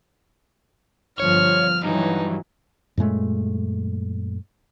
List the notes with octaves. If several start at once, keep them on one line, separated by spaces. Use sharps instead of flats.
G1 F3 C#5 F6
G2 E3 F#3 D#4
F#2 A#2 G#3 A3